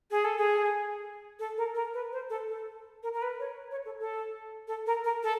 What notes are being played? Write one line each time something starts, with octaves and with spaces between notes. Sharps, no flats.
G#4
A4
G#4
A4
A#4
A#4
B4
C5
A4
A4
A#4
A#4
B4
C#5
C#5
A4
A4
A4
A#4
A#4
A4